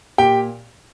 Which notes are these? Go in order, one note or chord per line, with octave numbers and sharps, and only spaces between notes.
A#2 G4 G5